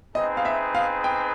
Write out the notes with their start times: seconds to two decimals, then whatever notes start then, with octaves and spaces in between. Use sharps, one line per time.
0.15 C4 D#4 G#4 B4 D#5
0.37 F5
0.45 E5
0.75 F5
1.04 G5